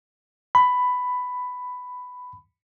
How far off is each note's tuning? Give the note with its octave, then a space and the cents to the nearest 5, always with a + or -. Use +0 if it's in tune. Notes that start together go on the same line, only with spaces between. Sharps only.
B5 +10